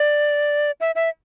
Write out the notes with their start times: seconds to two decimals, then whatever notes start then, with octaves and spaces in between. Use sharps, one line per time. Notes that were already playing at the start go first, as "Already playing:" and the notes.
Already playing: D5
0.81 E5
0.95 E5